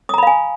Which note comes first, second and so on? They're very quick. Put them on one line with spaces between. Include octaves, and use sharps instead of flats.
D#6 A#5 B5 F5 G#5